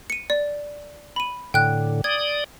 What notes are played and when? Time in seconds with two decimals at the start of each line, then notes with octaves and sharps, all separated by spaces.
0.10 C#7 D#7
0.30 D5
1.16 B5 D#7
1.54 A2 D3 G5 F#6
2.04 D5 D#6 G#6